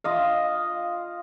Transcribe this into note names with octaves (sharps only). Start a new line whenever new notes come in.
F4 D#5 F5